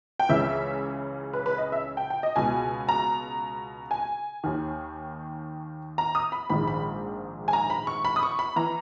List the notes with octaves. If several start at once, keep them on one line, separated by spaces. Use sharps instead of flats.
G5
C#2 C#3 E3 E5
B4
B4
D#5
E5
G5
G5
D#5
C#2 B2 G#5
A#5
G#5
D#2 D#3
A#5
D#6
B5
A#1 G#2 D#3 B5
B5
G#5
A#5
B5
C#6
B5
D#6
C#6
B5
E3 A#5